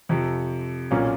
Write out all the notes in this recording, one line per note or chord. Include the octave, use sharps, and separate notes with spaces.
F2 C3 F3
B1 A#2 F3 A#3 C#4